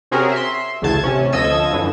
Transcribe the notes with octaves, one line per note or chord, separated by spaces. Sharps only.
C3 C4 C#4 F#4 G#4 A#4
E5 C6
A1 D2 A2 C#3 A5 G#6
C3 C#4
D2 F3 A4 D#5 E6 G#6
F#2 D3 E3